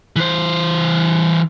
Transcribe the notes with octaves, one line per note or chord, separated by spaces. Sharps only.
E3 C5